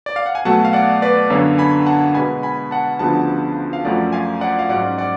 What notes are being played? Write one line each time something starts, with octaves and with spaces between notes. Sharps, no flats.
D5
F5
F#5
G#5
B2 F#3 A3 F#5 A5
F5
D5 F#5
B4 D5
F#2 D3 F#3 B3 D4 C#5 F5
G#5 B5
F#5 A5
B2 G#3 B3 G#5 B5
G#5 B5
F#5 A5
D2 C#3 F3 B3 D4 F#5 A5
F5
F#2 F3 A3 C#4 D5 F#5
F5 G#5
D5 F#5
F5
G#2 F#3 C#4 D5 F#5
D5 F#5